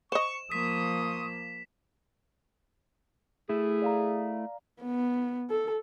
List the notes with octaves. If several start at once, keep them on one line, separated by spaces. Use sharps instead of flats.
C5 D#5 C#6 E7
F3 A#3 C6 C#6 D#6 B6
A3 E4 G#4
D5 F5 A#5
B3
A4